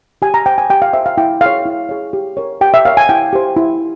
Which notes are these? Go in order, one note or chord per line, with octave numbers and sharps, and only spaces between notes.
G4 G#5
A#5
C5 G5
G#5
G4 G5
F5
C5 E5
F5
E4 G5
G#4 C#5 F5
E4
G#4 C#5
G4
A#4 C#5
G4 G5
E5
A#4 C#5 F5
G#5
E4 G5
G4 C5
E4